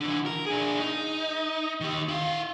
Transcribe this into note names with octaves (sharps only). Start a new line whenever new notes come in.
D3 E3
A#4
D4 G#4
D#4
D#3 G4
E4 F5